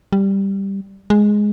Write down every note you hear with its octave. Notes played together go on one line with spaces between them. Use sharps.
G3
G#3